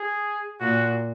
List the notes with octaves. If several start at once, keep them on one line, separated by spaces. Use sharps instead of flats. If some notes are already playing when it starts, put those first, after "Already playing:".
Already playing: G#4
A#2 F#4